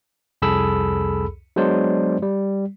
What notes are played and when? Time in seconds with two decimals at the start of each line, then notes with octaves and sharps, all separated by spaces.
0.42 C2 F2 G#4 A4 B5 E6
1.56 F#3 G#3 B3 D4 C5 D5
2.22 G3